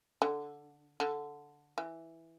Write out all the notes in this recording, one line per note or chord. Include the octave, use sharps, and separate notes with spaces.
D3
D3
E3